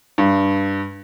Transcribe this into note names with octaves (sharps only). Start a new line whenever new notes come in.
G2